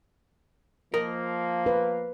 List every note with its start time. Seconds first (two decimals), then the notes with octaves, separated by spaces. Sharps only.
0.94 F3 A#3 A#4 D#5
1.66 B4